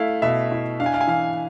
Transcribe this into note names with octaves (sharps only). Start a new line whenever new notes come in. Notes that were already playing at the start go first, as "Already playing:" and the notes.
Already playing: A3 E4 F5
B2 E5
E4
D4 F5
G#5
F5
G#5
E3 F5